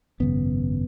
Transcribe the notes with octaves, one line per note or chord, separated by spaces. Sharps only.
G#1 F#2 C#3 B3